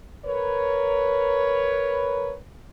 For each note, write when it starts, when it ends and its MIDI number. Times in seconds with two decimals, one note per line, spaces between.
0.25 2.34 70
0.25 2.34 71
0.25 2.34 73